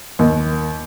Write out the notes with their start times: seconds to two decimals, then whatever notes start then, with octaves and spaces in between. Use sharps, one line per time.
0.19 D#2